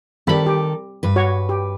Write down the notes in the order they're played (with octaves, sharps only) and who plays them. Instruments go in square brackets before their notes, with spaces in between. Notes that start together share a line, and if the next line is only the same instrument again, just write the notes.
[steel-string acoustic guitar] D#3 A4 [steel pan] G3 C4 B5
[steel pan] G4
[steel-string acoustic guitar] G2 B4
[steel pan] F#4 C#5
G4